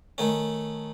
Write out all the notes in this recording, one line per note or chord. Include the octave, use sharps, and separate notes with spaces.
D#3 A3 C#4